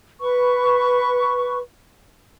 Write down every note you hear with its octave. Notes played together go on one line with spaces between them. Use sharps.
B4 C#6